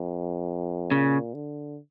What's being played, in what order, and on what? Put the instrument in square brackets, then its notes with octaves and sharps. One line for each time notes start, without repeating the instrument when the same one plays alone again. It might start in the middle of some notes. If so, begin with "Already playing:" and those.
Already playing: [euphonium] F2
[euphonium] A#2 [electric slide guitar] C#3
[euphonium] D3